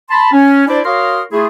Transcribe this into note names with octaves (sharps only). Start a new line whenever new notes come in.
A5 B5 C6
C#4
D4 E4 C5 D5
F#4 A#4 C#5 F5 C6 D#6
A3 E4 F4 G#4